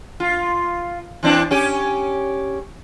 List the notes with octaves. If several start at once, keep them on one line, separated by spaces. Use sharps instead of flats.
F4
E3 C4 D4
C#4 G4